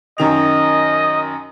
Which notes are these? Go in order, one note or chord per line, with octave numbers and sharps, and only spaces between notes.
F#2 D#3 D#5 F7